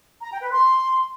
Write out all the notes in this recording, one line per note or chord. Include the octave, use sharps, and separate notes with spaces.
A#5
G5
B4
C6